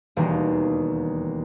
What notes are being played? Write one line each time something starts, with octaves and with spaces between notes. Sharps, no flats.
E1 D#2 G3 A#3